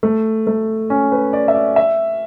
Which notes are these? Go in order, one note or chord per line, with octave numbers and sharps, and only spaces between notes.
A3
A3
C#4
B4
D5
E5
D5
E5